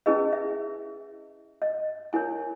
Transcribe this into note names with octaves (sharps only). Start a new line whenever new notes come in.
C#4 E4 G#4 B4 D#5
E5
D#5
E4 A#4 C#5 G#5